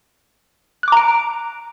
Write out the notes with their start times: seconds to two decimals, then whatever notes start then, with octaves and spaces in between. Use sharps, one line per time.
0.83 F#6
0.88 D6
0.92 A#5
0.97 D7